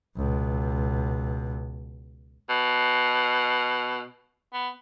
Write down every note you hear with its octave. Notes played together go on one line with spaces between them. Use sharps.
C#2 B2
B2
B3